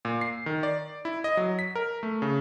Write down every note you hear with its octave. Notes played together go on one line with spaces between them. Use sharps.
A#2
C7
D#3
D5
E4
D#5
F#3
B6
A#4
A3
C#3